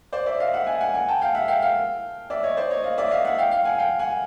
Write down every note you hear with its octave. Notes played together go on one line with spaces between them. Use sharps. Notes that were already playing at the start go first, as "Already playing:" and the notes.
C5 D5
D5 E5
D#5 F5
E5 F#5
F#5 G#5
F#5 G#5
F#5 G#5
G5 A5
F5 G5
E5 F#5
F5 G5
F5 G5
D5 E5
C#5 D#5
C5 D5
C#5 D#5
D#5 F5
D5 E5
D#5 F5
E5 F#5
F5 G5
F5 G5
F#5 G#5
F5 G5
F#5 G#5